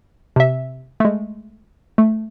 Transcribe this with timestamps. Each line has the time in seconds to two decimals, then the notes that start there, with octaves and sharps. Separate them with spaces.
0.36 C3 E5
1.00 G#3 A3
1.98 A3